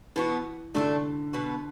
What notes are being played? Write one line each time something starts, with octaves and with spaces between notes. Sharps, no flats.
B2 E3 B3 F#4
D3 A3 D4 F#4 A4
B2 B3 F#4